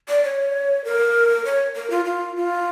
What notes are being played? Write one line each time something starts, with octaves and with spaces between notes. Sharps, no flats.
D5
C#5
A#4
C#5
A#4
F4
F4
F4